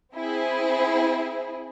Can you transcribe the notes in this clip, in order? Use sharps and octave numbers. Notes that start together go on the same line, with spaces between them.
C4 E4 G#4